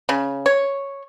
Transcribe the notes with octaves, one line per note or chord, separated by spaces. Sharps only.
C#3
C#5